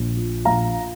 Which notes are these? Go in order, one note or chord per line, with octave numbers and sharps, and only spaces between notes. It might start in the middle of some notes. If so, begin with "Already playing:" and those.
Already playing: A#1
F3
A#1 F5 A#5